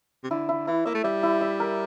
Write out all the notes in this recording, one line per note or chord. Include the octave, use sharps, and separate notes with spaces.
C3
D3 E4
E4
E3 E4
A#3 E5
A3
G3 E5
E4
E5
A#4